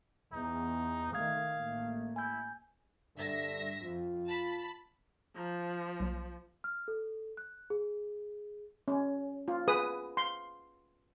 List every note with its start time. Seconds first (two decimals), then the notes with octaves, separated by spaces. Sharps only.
0.32 E2 D#4
1.13 D#3 A3 F5 D#6 G#6
1.56 A1 A3 A#3
2.16 E4 G#5 G6
3.17 G2 D3 E5 A#6
3.82 F2 F4
4.27 A5 B5
5.37 F3 A#5 G6 A#6
6.00 B1 F#3 A#3
6.64 F6
6.88 A4
7.37 F#6
7.70 G#4
8.88 C#4
9.48 F4
9.68 G#4 B4 D#6
10.17 C6